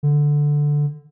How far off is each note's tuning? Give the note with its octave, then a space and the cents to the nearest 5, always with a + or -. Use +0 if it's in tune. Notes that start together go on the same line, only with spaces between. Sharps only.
D3 +0